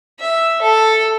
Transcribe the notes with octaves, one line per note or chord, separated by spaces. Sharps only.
E5
A4